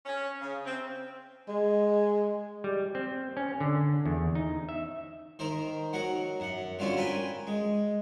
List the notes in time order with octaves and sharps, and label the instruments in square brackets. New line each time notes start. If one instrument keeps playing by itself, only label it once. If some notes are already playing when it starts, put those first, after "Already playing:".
[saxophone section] C#4
C#3
C4
[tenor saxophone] G#3
[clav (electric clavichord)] G3
C4
C#4
D3
E2
D#4
E5
[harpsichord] D#3 A#4 C5
F#3 A#4 F#5
F#2 F#5
D3 G3 C4 C#4 F4 F#4
A#4 B4 G5 G#5 C6
G#3